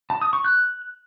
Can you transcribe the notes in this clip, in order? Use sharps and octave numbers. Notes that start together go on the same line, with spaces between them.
A5
D#6
C#6
F#6